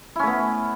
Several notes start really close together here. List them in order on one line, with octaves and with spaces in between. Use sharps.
E4 C#4 A3 B3